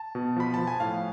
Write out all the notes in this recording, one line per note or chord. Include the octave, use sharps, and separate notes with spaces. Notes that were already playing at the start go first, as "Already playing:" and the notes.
Already playing: A5
B2
F3 B5
F3 A5
G#5
A2 F5